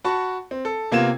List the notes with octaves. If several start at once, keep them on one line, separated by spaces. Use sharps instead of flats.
F#4 A5 B5 C#6
C4
A4
C3 A#3 B3 F4 G#6 E7